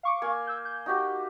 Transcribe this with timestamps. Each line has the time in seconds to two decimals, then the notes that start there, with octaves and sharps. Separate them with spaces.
0.03 F5 C#6 D6
0.22 A#3 G#5
0.47 E6 G6
0.65 G6
0.86 D#4 F#4 G4